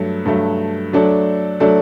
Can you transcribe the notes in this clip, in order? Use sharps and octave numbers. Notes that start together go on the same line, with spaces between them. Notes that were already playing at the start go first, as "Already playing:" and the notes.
Already playing: G2 F#3 A3
G2 F#3 A3
F#3 A3 D4 A4 D5
F#3 A3 D4 A4 D5